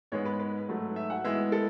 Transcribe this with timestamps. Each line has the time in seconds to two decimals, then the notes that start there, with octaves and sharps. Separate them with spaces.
0.12 G#2 G#3 B3 C#5
0.25 B4
0.39 B4
0.68 G#2 F#3 A3
0.96 E5
1.10 F#5
1.24 A2 G#3 B3 E5
1.52 A4